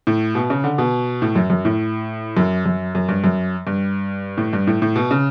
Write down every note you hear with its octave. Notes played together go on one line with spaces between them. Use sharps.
A2
B2
C#3
D3
B2
A2
F#2
F#2
A2
F#2
F#2
F#2
G2
F#2
G2
A2
G2
A2
A2
B2
C#3